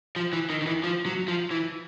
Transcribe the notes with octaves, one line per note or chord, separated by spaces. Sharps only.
F3
E3
D#3
D#3
E3
F3
F#3
F3
E3